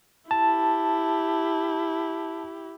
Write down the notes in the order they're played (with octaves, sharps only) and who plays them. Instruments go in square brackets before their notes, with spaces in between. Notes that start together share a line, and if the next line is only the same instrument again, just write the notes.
[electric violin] E4 G4 [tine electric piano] A5